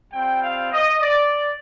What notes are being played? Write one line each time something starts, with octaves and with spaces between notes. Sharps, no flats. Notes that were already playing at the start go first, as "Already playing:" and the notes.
G3 C4 F4 G5
F5
D#5
D5